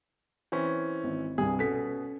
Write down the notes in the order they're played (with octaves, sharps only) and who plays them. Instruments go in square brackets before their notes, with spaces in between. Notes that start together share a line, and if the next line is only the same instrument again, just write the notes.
[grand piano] E3 C4 C#4
[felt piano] G#1
[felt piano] C2 G2 [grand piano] G#4
[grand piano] B2 B6 [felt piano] C#4 A4